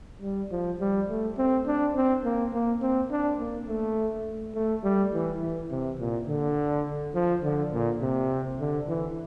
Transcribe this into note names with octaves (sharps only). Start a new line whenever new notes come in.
G3
F3
G3
A3
C4
D4
C4
A#3
A#3
C4
D4
A#3
A3
A3
G3
E3
E3
C3
A#2
D3
F3
D3
A#2
C3
D3
E3